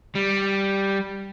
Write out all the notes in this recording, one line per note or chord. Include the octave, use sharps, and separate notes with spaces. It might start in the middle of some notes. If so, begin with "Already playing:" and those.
G3